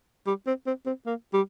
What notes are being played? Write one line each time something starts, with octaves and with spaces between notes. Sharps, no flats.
G3
C4
C4
C4
A#3
G3